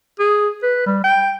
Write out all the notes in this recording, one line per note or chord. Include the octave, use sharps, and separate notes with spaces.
G#4
B4
G3
G5